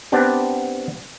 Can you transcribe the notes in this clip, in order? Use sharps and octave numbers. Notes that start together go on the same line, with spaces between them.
B3 C4 D4 G4